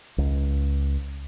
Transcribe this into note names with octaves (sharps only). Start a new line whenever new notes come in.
C#2